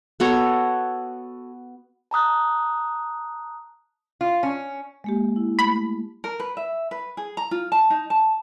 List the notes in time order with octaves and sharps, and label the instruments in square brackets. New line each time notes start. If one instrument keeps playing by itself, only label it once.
[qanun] B3 F#4 A4 C#5
[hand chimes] A5 A#5 D#6 F#6
[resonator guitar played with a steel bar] F4
C#4
[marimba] G#3 A#3 G4
E4
[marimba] A3 [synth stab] B5
[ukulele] A#4
B4
E5
B4
G#4
A#5
F4
A5
D#4
A5